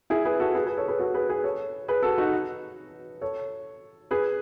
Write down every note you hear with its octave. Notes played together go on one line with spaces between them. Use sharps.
E4 G#4
G#4 B4
F#4 A4
G#4 B4
G#4 B4
A4 C#5
G#4 B4
F#4 A4
G#4 B4
G#4 B4
A4 C#5
G#4 B4
F#4 A4
D#4 F#4
A4 C#5
G#4 B4